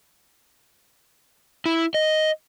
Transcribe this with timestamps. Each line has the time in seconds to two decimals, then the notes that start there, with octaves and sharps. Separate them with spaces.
1.66 E4
1.94 D#5